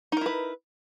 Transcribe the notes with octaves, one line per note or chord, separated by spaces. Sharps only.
D#4 E4 A#4 B4